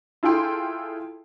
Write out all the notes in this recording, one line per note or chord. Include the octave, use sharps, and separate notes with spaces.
E4 F4 G#4 A4 G5 C6